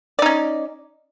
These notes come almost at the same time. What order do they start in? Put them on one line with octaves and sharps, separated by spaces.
D5 D#4 C#4